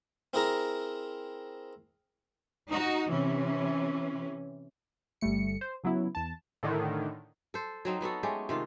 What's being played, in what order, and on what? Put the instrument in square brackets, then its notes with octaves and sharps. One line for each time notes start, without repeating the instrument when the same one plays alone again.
[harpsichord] C4 E4 G#4 A#4 A#5
[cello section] D#4 F#4
C3 E3 C#4
[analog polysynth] G1 G3 A3 C#7
C5
C#3 F#3 B3 E4
E2 A5
A2 D3 D#3
[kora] A4 C5
F#3 C4 D#4
F#3 B3 F#4 A4
G#3 A3 C#4 G4
C3 D#3 F4